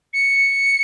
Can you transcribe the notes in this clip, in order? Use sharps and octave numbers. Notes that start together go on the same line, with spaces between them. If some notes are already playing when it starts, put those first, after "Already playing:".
C#7